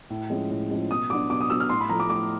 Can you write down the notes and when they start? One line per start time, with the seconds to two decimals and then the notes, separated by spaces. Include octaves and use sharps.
0.10 A2
0.30 F3 G#3 C#4
0.51 A2
0.70 F3 G#3 C#4
0.90 B2 D#6
1.10 F#3 B3 D4 D6
1.30 B2 D6
1.41 D#6
1.50 F#3 B3 D4 E6
1.60 F6
1.70 A2 C6
1.81 B5
1.90 F3 A3 A#5
2.00 D6
2.10 A2 D6